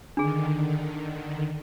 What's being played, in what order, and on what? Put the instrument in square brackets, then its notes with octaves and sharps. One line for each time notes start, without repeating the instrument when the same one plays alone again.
[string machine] D3 D#3 [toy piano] D4 G#4